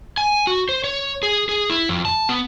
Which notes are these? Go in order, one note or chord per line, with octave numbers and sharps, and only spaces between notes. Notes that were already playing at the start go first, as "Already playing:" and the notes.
G#5
F#4
C5
C#5
G#4
G#4
E4
F2
A5
B3